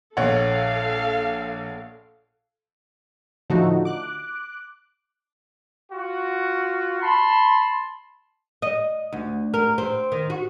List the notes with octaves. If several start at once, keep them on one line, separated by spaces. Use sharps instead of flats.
A#1 A4 C#5 F5 F#5
A2 D3 F3 A3 D#4 F#4
D6 F#6
F4 F#4
A5 B5 C6
D#5
D2
A#4
C4
D#3
F#4